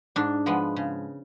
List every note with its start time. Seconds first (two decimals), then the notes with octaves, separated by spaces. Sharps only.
0.16 G#2 D4
0.46 F3 G#3 B3
0.76 C#3